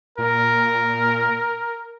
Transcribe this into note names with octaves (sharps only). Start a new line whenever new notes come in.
A#2 A#4